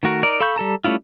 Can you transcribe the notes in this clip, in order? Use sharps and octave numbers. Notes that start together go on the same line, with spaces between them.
D#3 A3 F#4 A#4
D#4 A#4 D5
A4 F5 B5 C#6 G6
G3 A4 A5 A#5
G3 A3 C#4 E4 F4